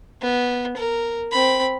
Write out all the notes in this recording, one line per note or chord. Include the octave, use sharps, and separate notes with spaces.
B3
A#4
C4 B5